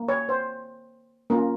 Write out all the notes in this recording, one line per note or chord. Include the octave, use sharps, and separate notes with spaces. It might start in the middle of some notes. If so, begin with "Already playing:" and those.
Already playing: A#3
C#5
C5
A#3 C#4 F4 A#4